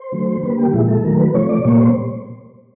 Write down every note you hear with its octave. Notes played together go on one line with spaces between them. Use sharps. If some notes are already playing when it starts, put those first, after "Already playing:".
Already playing: C5
D3 F#3 A3
D3 G3 A#3 B4
G4
A#2 F3 G#3 E4
A4
D#3 F#3 A3 A#4
B4
C3 F3 A3 C#5
D5
A#2 G3 A#3 C#5
C5